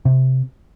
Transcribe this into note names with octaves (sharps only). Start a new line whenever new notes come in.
C3